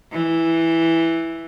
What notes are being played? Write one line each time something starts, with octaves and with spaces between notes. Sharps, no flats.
E3